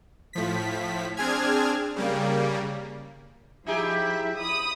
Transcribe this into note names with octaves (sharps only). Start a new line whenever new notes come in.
A2 F3 B6
C4 D4 G#4 F6 G#6
C#3 G3 A#3
F3 D#4 E4 G4 G#4 E5
B5 D#6